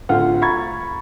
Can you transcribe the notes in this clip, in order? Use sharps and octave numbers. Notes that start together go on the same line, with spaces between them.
D1 D2 F4 F#5 F6
A#5 B5 C#6 G#6 A6